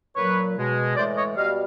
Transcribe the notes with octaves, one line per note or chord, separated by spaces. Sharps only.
A#2 F#3 B4 C#5
B2 G#3
A2 E3 G#3 C5 D5
C#5 D#5
B2 G3 D#5 F5